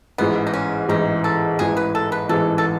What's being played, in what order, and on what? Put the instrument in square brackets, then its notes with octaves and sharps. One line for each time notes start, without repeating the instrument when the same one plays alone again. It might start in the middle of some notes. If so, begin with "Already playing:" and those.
[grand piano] A1 G#2 E3 [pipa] B3
[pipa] D#4
C#4
[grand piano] A1 G#2 E3 [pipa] D#4
[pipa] A4
[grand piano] A1 G#2 E3 [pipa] G#4
[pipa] B4
A4
B4
[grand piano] A1 G#2 E3 [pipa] A4
[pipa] A4